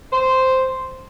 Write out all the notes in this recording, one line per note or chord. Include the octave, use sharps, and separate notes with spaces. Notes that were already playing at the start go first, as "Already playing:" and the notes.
C5